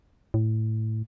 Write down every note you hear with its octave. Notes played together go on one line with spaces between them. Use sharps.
A2